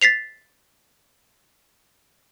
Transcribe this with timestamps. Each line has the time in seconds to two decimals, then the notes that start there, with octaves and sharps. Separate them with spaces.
0.01 A6 B6 C7 F7